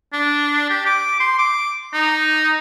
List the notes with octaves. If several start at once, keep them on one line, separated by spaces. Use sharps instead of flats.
D4
G4
D6
C6
D6
D#4